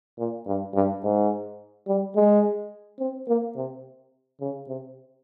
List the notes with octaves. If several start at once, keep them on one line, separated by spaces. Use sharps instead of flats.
A#2
G2
G2
G#2
G3
G#3
C4
A#3
C3
C#3
C3